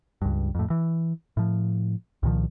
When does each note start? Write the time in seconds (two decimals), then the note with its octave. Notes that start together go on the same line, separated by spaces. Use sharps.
0.22 C#2 G2
0.55 F2 A2
0.70 E3
1.37 A2 F3
2.23 C2 A#2 D#3 F3